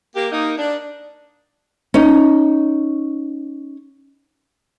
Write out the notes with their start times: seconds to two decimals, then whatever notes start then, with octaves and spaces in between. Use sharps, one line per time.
0.16 A#3 G4
0.31 A#3 D#4
0.57 D4
1.94 C#4 D#4